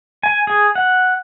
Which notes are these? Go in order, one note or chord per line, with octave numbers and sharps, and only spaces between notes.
G#5
G#4
F#5